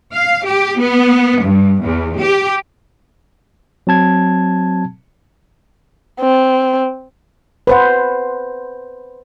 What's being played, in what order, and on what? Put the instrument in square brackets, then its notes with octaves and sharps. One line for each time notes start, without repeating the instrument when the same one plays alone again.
[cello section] F5
G4
B3
G2
E2
G4
[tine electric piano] F#3 C4 A5 G#6
[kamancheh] C4
[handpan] B4 C5 F#5